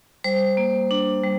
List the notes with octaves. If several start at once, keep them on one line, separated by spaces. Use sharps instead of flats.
G3 C5
A#3
D4
G3